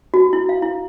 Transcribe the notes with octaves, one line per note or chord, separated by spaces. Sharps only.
F#4
E4
F5
E4